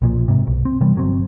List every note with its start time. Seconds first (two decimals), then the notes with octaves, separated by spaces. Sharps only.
0.02 B1 A#2 F3
0.28 G#2 C3
0.47 B1
0.65 C4
0.81 C3 E3 G3 B3
0.95 G1 F#3 C4